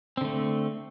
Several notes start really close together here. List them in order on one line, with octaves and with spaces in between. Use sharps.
C4 D3 A3